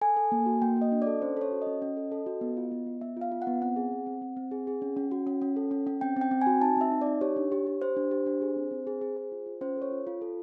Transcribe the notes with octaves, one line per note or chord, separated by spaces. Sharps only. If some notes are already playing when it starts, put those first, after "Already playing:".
A4 G#5
A4
A#3
F#4
A#3 G5
F#4 D#5
D4
A4 D5
C#4 C5
A4 C#5
F#4
D#5
C#4
C#4
A4
A4
F#4
B3
F4
B3
B3
B3 E5
F4 F5
F4
F#5
B3
C4 F#5
G#4
C4
C4
C4
C4
G#4
G#4
C#4
C#4
F#4
C#4
C#4
A4
C#4
C#4
C4 G5
C4 G5
C4
G#5
F#4
D#4 A5
C4 E5
D#4
D#4 D5
G4 C#5
D4
G4
G4
G4 C5
D4
G4
D4
G#4
C4
C4
G#4
G#4
G#4
F4
F4
C#4 C5
A4
C#5
F4
F4
A4